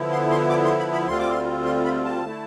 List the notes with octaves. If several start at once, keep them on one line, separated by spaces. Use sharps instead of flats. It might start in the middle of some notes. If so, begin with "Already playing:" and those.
Already playing: D3 F3 B3 E4
C6
C6
D6
C6
B5
B5
D2 D3 G3 C4 F4 C6
D6
C6
C6
B5
A5
D3 A3 E4